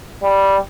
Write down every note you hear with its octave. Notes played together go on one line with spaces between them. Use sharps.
G3